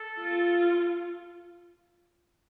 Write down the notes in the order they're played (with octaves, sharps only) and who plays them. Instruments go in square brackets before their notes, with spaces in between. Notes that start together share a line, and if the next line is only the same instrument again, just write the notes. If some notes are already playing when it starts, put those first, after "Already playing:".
Already playing: [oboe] A4
[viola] F4